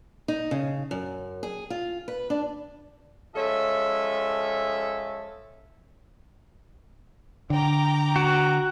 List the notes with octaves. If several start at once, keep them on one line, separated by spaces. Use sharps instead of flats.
D#4
C#3
F#2
G#4
F4
B4
D4
F3 G#3 C#4 A4 E5
D3 G5 A#5 D6
F#4